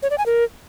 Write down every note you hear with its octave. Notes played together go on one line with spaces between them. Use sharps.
C#5
D5
G#5
A#4